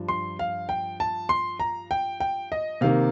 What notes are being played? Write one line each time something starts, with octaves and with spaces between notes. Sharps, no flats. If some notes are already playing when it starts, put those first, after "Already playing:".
Already playing: G2 F3
C6
F5
G5
A5
C6
A#5
G5
G5
D#5
C3 D#3 A#3 F5